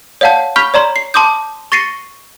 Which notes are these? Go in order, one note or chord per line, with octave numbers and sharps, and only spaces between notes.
C#5 D5 F5 F#5 A5 G6
B5 C#6 F6 G6 B6
C#5 D5 A#5 C6
C7
A5 C6 D6 D#6 G6
C#6 A6 A#6 C7 C#7 D#7